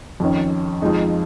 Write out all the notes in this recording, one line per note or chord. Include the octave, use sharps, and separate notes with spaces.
F2 D#3 C#4
F2 F3 G#3 D#4